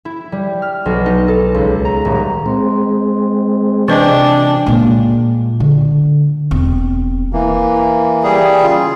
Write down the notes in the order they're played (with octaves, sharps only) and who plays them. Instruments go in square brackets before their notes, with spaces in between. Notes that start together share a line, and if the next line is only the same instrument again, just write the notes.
[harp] E4
G3
F6
B1
D#4
A4
C#2
A#5
D#1
[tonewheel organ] G#3 C4 [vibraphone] C6
[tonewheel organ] C3 [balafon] E3 B4 D#5 [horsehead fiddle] D4 [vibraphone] G5 G#5
[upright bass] A#2 G#3
D3
E1 C4
[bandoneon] E3 A#3
[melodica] G3 G#4
[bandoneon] C#3 F4